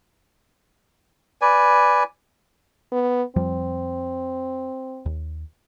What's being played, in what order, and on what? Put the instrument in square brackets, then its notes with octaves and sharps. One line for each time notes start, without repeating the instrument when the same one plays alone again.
[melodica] B4 D5 G#5
[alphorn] B3
[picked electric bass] F2 F3 G3 [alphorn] C4
[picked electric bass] D#2